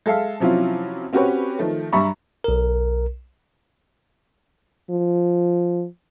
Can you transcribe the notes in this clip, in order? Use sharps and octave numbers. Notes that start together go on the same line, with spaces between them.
G#3 A4 E5 F5
C3 F3 F#3 C#4 E4 F4
C4 C#4 F#4 G4 B4 C#5
D#3 F3 A3
G2 G3 E5 A#5 B5 C#6
B1 A#4
F3